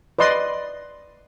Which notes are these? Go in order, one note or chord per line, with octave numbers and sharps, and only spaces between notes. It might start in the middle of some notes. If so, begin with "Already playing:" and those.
B4 D5 D#5 C6